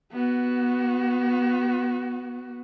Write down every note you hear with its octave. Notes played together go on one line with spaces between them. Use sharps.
B3 F#4